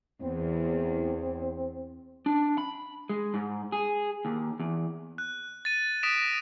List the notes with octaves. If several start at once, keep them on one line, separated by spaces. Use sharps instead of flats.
E2 C4
D4
B5
G#3
G#2
G#4
D#2
E2
F#6
A6 D#7
D#6 A#6 B6 D7 E7
A#6